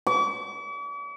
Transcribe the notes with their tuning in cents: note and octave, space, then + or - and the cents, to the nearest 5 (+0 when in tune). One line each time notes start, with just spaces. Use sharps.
D6 -45